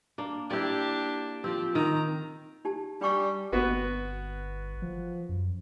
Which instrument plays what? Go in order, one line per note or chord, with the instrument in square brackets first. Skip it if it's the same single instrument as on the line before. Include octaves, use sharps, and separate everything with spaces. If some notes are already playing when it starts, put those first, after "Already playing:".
[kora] A#3 D4
[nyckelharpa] D4 G4 [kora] E4 D5
[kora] F3 C4 [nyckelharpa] G4
[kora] D#3 [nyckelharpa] A#5
[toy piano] D#4 G4 A5
[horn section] G3 [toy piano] D4 G5 C#6
[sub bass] G1 [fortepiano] B3 F#4 B4
[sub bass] F3
F#2